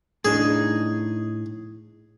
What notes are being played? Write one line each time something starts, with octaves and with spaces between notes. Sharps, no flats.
A2 D4 D#4 G#4